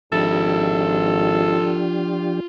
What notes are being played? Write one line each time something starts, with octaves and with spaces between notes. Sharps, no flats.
G#1 F3 D4 F4 G4 A4 E5